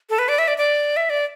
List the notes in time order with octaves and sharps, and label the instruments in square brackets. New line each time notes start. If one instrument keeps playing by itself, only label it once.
[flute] A4
B4
D5
E5
D5
D5
E5
D5